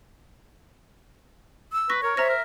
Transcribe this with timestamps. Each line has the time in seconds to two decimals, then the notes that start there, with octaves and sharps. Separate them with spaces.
1.73 E6
1.90 B4 C#6 A#6
2.02 A#4 C#5
2.17 C5 E5 A#5 F6 A#6
2.30 A#4